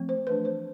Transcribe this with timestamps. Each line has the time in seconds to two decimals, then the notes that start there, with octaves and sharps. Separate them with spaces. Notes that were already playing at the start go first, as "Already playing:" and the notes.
Already playing: F3 A3 C4
0.09 C5
0.27 E3 A3 D4 B4
0.45 C5